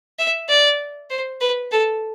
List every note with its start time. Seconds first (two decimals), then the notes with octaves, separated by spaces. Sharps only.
0.19 E5
0.49 D5
1.10 C5
1.41 B4
1.72 A4